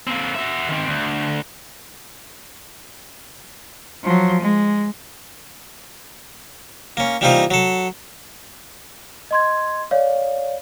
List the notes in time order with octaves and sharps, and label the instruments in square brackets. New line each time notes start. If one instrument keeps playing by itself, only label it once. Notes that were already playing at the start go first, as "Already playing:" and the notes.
[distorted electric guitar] A#3 C4
F#4 E5
D#3 C4
D2
[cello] F3 F#3
G#3
[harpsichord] A#3 C#4
E3 G3 A#3 C4 D#4 F4
F#3 A4
[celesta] D#5 C6 G#6
C#5 D5 F5